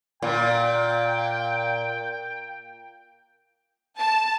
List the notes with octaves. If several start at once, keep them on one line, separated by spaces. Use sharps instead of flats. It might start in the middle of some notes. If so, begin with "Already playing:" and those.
A#2 G5
A5